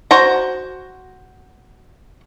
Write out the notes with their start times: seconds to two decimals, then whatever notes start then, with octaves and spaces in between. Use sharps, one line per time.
0.11 F#4 C5 A#5